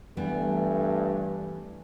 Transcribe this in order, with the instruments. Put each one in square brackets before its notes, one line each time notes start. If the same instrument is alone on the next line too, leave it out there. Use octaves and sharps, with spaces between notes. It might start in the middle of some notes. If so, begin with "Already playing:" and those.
[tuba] G2 [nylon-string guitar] E3 G3 B3 [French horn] A3